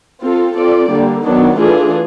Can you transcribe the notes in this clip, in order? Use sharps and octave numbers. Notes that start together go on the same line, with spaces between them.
C4 F4 A4
C4 F4 A4 D5
D3 G3 A#3
D#3 F#3 B3 D4
E3 A3 D4 F4 G#4